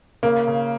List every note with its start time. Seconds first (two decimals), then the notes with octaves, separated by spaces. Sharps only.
0.23 C#3 A#3
0.48 C#3